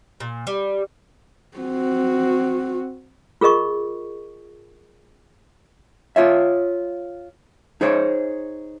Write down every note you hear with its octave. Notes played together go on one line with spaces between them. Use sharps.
A#2
G3
C4 F#4
F4 G#4 A#4 D#5 C#6
F4 C#5 E5
D#4 G#4 C5 C#5